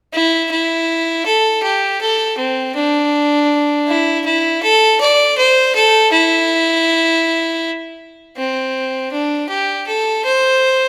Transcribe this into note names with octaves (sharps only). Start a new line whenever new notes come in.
E4
E4
A4
G4
A4
C4
D4
E4
E4
A4
D5
C5
A4
E4
C4
D4
G4
A4
C5